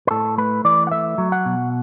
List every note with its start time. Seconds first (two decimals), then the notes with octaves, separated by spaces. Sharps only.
0.07 B4
0.11 A2 A4
0.38 A3 B4
0.65 E3 D5
0.87 F#5
0.91 A3 E5
1.18 F#3
1.32 F#5
1.45 B2